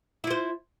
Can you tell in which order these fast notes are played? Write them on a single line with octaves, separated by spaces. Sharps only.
E4 F4 C5